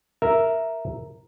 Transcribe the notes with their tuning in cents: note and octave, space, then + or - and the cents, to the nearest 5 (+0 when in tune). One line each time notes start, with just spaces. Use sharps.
A#4 +0 E5 +0